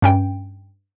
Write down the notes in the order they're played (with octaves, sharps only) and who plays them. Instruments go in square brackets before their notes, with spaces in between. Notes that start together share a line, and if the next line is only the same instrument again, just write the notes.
[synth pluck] G2 C#4 G5